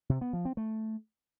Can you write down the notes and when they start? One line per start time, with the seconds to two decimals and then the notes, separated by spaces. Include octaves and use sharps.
0.09 C3
0.21 B3
0.33 F3
0.45 C4
0.57 A3